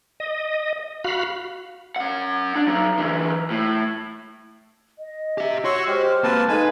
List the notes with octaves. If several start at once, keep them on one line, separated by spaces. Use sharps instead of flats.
D#5
F#4 F5 B5
C#4 F#5
D4
F#3 D#4
D3 E3
A2
D#5
G4 E5
F#4 C#5 C6 E6
G#3 G4 C5 C6 F6
A#3 C4 B4 A5
G#3 D#4 A4 B4 F5 G#5